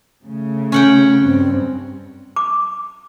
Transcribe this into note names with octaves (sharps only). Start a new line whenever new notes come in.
C#3 A3
C#4 F#5 G5
G2 C4
D6